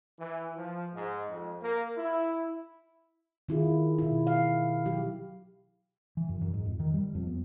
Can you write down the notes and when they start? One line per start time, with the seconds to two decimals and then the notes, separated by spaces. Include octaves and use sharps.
0.19 E3
0.56 F3
0.94 G#2
1.29 F2
1.62 A#3
1.98 E4
3.49 D#3 E4 F4 G#4
3.99 B2 E4
4.27 F5
4.86 F#3 G4
6.17 E3
6.29 F#2
6.41 F#2
6.53 G#2
6.65 F2
6.80 D#3
6.94 G3
7.15 F2
7.27 B3